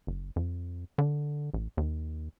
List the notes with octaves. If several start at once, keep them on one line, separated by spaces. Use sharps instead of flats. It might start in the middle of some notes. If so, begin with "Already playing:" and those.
F#1
F2
D3
A1
D#2